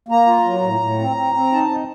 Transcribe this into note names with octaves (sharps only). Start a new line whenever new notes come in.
A#3 A#5
F4
F#3
A2
A2
C4
C4
C4
D#4 A5
D#4